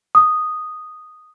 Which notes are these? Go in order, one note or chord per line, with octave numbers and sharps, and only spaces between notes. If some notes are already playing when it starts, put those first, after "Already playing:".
D#6